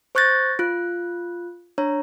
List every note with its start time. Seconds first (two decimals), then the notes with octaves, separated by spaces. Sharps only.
0.15 C5 C#6 F#6 G6 A6 A#6
0.59 F4 F#6
1.78 D4 C#5 A#5